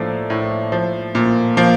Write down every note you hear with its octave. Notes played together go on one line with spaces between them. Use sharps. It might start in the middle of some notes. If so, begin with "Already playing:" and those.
Already playing: A2 F3 A3 A#3 D4
A2
F3
A#2
F3 A#3